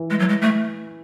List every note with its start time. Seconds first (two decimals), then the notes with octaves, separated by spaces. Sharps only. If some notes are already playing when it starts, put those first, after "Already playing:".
Already playing: E3
0.10 G#3
0.20 F#3
0.29 G#3
0.42 A3